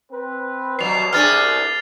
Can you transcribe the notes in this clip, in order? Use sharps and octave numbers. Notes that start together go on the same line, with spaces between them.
C4 B4
C2 B2 F#3 C7 F7
B3 D4 G#4 F6 A6